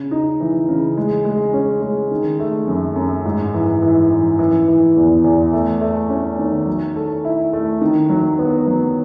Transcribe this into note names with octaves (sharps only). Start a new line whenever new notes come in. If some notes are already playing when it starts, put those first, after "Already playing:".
Already playing: C#3
D#4
E3
C#3
G#3
G#3
C#4
G#3
D#3
A3
F#2
F#2
G#2
E3
E3
E3
E3
E3
E2
E2
A3
A3
C#4
D#3
F#3
A4
E4
A3
D#3
F#3
B3
F#3